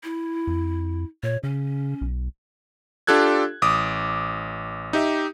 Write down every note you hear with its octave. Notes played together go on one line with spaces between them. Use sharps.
E4
F2
A#2 C#5
C#3 C#4
B1
D4 F4 G4 A4 F#6 G#6
A1 D6 D#6
D#4 G4 E5